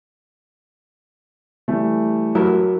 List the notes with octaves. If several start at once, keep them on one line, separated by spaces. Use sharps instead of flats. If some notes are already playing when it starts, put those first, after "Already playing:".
E3 G3 A3
F#3 E4 A#4